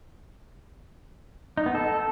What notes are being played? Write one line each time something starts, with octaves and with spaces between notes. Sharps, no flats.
D#4
B3
A4